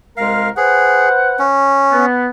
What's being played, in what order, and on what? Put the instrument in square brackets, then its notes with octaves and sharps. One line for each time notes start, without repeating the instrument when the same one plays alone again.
[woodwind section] C2 G#3 A#4 [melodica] F5
[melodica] G#4 [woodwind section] B4 C5 F#5
[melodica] C#4
[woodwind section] B3